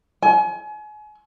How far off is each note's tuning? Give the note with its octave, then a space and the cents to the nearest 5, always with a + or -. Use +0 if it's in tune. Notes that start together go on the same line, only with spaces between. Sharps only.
G#5 +35